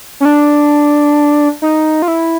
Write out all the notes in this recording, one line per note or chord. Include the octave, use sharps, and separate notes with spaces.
C#4
D4
D#4
F4
E4